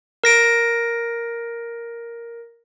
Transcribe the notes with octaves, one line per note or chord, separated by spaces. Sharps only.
A#4 A#6 D7